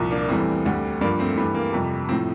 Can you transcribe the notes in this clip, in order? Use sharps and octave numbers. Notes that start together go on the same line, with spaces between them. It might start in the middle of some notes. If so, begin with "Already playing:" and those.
Already playing: C2 A#2 F3
A#3 D4
E2 E3 G3 A3 C4
D2 D3 G3
G2 F3 A#3 D4
A3 C4
G2 E3 G3 A3
A#3
F2 C3 G3
A2 F3 A3 C4